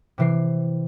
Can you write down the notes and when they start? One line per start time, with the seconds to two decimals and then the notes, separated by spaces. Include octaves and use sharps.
0.18 C3 E3 C7